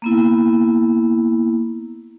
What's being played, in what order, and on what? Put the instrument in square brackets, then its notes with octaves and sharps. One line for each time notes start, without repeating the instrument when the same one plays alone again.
[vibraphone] A#3 B3 E4